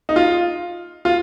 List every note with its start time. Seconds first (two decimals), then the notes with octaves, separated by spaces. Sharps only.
0.09 D#4
0.16 F4
1.05 F4